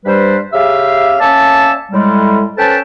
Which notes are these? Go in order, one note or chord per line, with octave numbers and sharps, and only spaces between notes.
G2 G3 B4 C5
C#3 G4 E5 F5
A#3 C#4 C#5 D5 E5 A5
A2 G3 G#3
C#4 A4 B4 C5 G5 A5